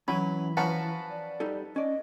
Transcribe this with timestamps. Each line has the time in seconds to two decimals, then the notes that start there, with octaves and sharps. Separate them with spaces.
0.08 E3 F#3 C#4 E4 G#5 B5
0.57 F3 C#4 F#4 B4 F#5 A5 A#5
1.11 D5
1.40 G3 D#4 A4
1.76 C#4 D5 D#5